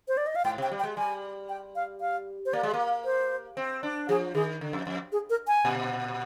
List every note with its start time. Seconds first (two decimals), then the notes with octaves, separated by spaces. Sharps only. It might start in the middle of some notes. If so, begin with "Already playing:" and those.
0.08 C5
0.17 D5
0.27 D#5
0.36 F5
0.45 G#2 G5
0.58 C3 G5
0.71 G3
0.79 G5
0.84 G#3
0.97 G3 G#5
1.49 G5
1.76 F5
2.01 F5
2.46 C5
2.53 A#3 D5
2.63 G#3
2.74 A#3
3.05 C5
3.57 C4
3.83 D4
4.09 F3 G#4
4.35 D#3 G#4
4.61 D3
4.73 F2
4.87 F2
5.12 G#4
5.30 A#4
5.48 G#5
5.65 A#2